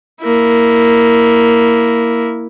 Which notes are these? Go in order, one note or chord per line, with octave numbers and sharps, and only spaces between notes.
A#3 E4